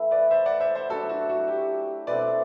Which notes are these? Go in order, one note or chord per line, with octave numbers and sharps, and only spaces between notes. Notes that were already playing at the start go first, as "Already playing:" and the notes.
Already playing: E3 A3 E4
B4 D5
C5 E5
D5 F#5
C5 E5
C5 E5
F#3 A3 D4 F#4 A4
F#4
F#4
G4
B2 A3 C4 G4 B4 D5